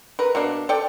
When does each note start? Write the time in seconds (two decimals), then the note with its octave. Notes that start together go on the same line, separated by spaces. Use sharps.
0.19 A#4 B4
0.35 B2 A#3 D4
0.69 A4 D5 G5